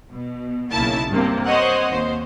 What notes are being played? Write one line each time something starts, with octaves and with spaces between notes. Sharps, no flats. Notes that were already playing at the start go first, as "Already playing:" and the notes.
B2
B1 C#3 A#3 E4 A5
G2 C3 A#3
C5 C#5 D#5 F#5
D#2 C5